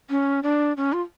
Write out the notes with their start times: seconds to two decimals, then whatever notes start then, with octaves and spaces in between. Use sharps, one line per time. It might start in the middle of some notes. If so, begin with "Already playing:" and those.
0.10 C#4
0.43 D4
0.77 C#4
0.93 F4